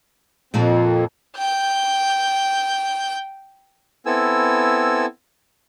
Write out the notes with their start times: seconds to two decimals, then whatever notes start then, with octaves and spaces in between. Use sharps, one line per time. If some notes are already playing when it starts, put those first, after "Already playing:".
0.54 F2 A#2 F3 A#3
1.37 G5 G6
4.06 B3 C4 E4 A4 G#5 E6